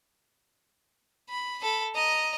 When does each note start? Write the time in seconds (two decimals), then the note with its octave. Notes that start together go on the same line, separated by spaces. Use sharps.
1.29 B5
1.62 A4 B5
1.95 D#5 A#5